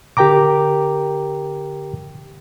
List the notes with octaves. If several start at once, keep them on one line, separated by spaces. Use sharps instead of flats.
D3 G4 A#4 G5 A#5 D6